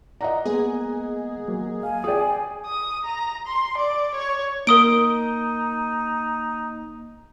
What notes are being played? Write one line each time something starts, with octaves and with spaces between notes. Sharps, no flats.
D5 D#5 F#5 A#5
G#3 A#3 B3 G#4
F#3 G#3 A#3
F5 G#5
G#4 D5 G5 D#6
D#6
A#5
C6
D5
C#5
A#3 D#4 A#4 D#6 D7